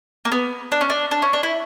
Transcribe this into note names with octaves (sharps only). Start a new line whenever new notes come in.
A#3
B3
D4
C#4
D4
D4
C#4
D4
E4